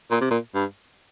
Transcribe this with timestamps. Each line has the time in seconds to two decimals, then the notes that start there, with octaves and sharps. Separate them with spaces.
0.11 A#2
0.21 C3
0.30 A#2
0.54 G2